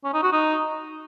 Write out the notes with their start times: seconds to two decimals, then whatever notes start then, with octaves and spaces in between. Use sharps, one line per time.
0.04 C#4
0.14 D#4
0.23 F#4
0.33 D#4